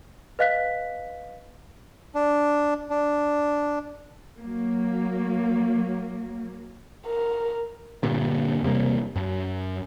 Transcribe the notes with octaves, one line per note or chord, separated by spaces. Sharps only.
B4 D#5 F5 F#6 B6
D4
D4
F#3 A#3
A#4
G2 A#2 D3
E1 C3 G3 A#3
F#2